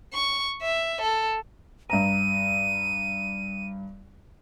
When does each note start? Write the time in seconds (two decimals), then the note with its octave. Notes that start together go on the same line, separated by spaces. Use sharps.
0.13 C#6
0.62 E5
1.02 A4
1.90 G2 A#5 D#7